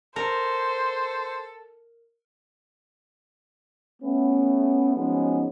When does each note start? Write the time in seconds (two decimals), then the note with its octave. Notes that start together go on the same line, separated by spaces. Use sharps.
0.16 A4 A#4 C5
4.03 A3 B3 C#4
4.94 F3 F#3 G#3 B3 C#4 D#4